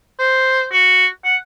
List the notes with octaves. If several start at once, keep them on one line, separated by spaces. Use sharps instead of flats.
C5
F#4
F#5